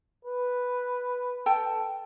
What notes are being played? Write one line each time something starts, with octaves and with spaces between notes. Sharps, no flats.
B4
A4 G5 A5